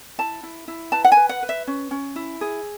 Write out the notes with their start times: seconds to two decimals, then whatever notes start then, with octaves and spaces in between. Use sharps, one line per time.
0.18 E4 A5
0.43 E4
0.68 E4
0.92 B4 A5
1.04 F#5
1.12 B4 G#5
1.29 F#5
1.43 B4
1.49 E5
1.67 C#4
1.91 C#4
2.16 E4
2.41 G#4